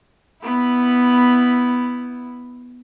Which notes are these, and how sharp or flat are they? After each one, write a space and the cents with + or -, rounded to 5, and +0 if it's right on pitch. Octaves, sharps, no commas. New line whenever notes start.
B3 +0 E4 -5